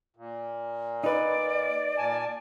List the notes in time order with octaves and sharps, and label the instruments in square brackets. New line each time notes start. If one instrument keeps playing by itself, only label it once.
[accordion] A#2
[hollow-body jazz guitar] D#4 B4 [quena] D5
[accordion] A#2 G#5 A5